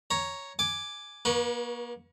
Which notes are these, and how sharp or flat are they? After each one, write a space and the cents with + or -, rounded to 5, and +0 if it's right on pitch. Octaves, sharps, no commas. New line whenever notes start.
C#5 +0 A#5 +5
G#5 +0 D6 +0
A#3 +35 B4 -30 C#6 +5